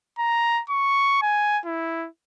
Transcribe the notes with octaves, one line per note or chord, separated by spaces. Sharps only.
A#5
C#6
G#5
E4